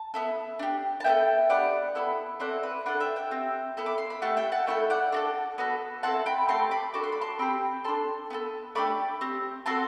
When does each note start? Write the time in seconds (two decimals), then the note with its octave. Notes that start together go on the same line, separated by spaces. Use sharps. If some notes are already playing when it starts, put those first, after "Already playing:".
Already playing: A5
0.14 B3 E4 A4
0.59 D4 G4
1.00 A5
1.04 B3 D4 E5 G5
1.09 A4
1.49 B3 D4 G4 D5 F#5
1.95 B3 E4 A4
2.40 C4 E4 A4 D5 F#5
2.63 B4
2.86 D4 A4 D5 F#5
3.00 E5 G5
3.16 E5 G5
3.31 C4 G4
3.77 B3 E4 A4
3.86 D6
3.98 C6
4.10 B5
4.22 A3 E4 G4 F#5 A5
4.37 E5 G5
4.52 F#5 A5
4.67 A3 E4 A4 E5 G5
4.90 D5 F#5
5.12 D4 F#4 A4
5.58 B3 F#4 A4
6.03 C4 E4 A4 F#5 A5
6.26 G5 B5
6.48 A3 C4 G4 A5 C6
6.71 B5 D6
6.94 D4 F#4 A4 D6
7.04 C6
7.12 B5
7.21 A5 C6
7.39 C4 G4 G5 B5
7.84 D4 A4 A5 C6
8.30 B3 F#4 A4
8.75 A3 D4 G4 B5 D6
9.21 C4 G4
9.66 C4 F#4 A4 A5 C6